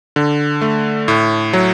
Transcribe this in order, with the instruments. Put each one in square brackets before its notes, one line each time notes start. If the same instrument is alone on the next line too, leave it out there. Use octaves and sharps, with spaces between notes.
[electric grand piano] D3
A3
A2
F#3